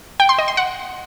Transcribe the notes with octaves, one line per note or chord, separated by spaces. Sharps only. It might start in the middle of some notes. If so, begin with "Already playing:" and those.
G5
C6
D#5
C6
F#5